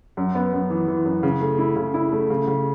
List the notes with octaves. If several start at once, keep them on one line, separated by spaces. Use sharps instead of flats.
F#2
B3
F#2
E3
E3
F#2
C#3
A3
E4
C#3
E4
A3
C#3
C#3